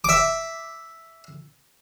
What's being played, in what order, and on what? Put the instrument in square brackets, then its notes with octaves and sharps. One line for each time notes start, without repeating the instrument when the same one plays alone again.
[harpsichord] E5 D6